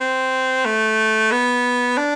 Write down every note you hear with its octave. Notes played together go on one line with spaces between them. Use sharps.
C4
A3
B3
D4